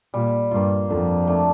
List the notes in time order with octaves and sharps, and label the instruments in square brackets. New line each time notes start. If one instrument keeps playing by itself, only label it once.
[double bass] A#2 [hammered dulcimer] G3
[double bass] G2 [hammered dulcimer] A#3 F4
[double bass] F2 [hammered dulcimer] D3
[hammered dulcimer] A3 D4